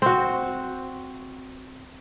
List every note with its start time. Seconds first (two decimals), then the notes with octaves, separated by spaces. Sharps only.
0.02 C4 F#4